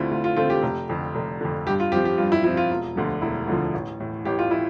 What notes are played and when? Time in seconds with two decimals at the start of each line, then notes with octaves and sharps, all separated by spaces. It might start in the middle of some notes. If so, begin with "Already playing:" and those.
Already playing: D2 D3 A3 C4 E4 F4
0.11 D2 F4
0.24 F4
0.36 D3 A3 C4 F4
0.50 G4
0.63 F1
0.89 F2 D3
1.15 F1
1.41 F2 D3
1.66 G2 G4
1.80 F4
1.92 F3 C4 G4
2.05 G4
2.18 G2 F4
2.32 E4
2.44 F3 C4 E4
2.57 F4
2.71 E1
2.96 D2 D3 F3
3.22 E1 E4
3.47 D2 D3 F3
3.74 A1
4.00 A2 E3
4.25 A1 G4
4.39 F4
4.51 E3 E4